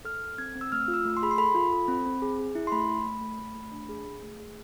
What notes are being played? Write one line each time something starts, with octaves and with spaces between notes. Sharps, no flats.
A4 F6
A4
C4 G#6
C4
E6
A3 F6
F4
E6
A3
C6
G#4 B5
C6
A4 B5
F4
A4
C4
C4
G#4
G#4
E4
C6
A3 B5
A3
A3
A3
A3
A3
D4
G#4
G#4
A3
G#4